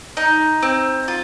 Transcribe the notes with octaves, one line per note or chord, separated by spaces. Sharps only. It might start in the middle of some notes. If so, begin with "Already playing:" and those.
D#4
C4
F4